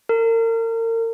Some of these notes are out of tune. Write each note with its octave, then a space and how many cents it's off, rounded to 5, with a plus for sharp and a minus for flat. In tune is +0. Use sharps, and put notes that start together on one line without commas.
A#4 -35